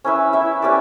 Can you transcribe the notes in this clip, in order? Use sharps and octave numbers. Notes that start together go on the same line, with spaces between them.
C#4 E4 B4 E5
E4 B4 E5
C#4 G4 B4 D5